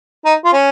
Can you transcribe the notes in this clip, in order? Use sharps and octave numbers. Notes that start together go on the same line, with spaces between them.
D#4
F4
C#4